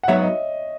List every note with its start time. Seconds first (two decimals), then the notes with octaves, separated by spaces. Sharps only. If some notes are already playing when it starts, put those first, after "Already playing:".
0.03 F#5
0.08 G#2 F#3 B3 D#4 F#4 C#5 E5
0.22 D#5